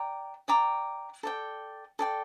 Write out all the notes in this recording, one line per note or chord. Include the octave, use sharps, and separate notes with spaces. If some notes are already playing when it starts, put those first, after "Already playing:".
Already playing: D5 G5 A#5 D6
D5 G5 A#5 D6
A4 D5 G5
A4 D5 G5